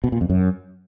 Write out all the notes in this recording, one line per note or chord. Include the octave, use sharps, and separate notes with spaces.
B2
A#2
F2
F#2